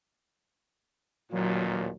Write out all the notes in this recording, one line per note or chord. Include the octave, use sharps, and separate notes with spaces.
A1 D#2 A#2 F#3